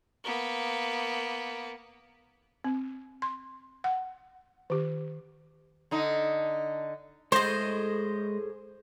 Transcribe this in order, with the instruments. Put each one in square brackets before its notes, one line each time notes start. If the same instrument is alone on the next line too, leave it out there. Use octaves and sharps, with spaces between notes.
[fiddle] A#3 B3
[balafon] C4
C6
F#5
D#3 G4
[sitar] D3 D#4
[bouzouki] A2 G#4 [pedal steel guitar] G#3 D#5 [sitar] C5